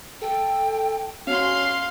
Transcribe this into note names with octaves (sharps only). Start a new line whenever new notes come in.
A4 G5
C#4 F#4 F5 C6